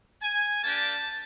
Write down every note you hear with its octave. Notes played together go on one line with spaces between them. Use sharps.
G#5
A#3 D4 G4 A5